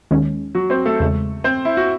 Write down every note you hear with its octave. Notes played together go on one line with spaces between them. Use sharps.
D#2 D#3 G#3 C#4
F#3 F#4
C4 C5
A3 A4
E2 C#3 G#3
C4 C5
E4
F#4